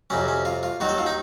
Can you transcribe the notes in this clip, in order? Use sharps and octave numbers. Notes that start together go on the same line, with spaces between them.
F2 C3 F#3 C#4
C#4
F4
F4
D#2 D#3 F#3 F#4
A4
F4
D#4